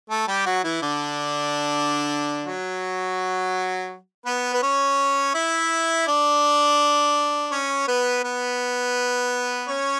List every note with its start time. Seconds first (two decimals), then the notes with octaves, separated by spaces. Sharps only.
0.10 A3 A4
0.28 G3 G4
0.46 F#3 F#4
0.64 E3 E4
0.82 D3 D4
2.45 F#3 F#4
4.26 B3 B4
4.54 B4
4.63 C#4 C#5
5.34 E4 E5
6.07 D4 D5
7.52 C#4 C#5
7.88 B3 B4
8.24 B3 B4
9.68 C#4 C#5